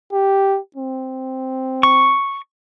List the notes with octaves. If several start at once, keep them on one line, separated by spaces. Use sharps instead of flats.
G4
C4
C#6